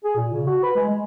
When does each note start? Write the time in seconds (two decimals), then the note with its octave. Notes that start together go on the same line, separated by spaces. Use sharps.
0.04 G#4
0.16 A#2
0.33 C#3
0.47 F#4
0.63 B4
0.76 G#3
0.90 G#3